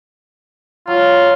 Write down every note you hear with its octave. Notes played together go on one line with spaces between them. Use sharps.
F#3 F4